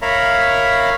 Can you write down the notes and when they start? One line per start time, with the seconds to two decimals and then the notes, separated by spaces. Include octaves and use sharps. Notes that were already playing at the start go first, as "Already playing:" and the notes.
0.02 A#4 C#5 E5 F5 A#5 B5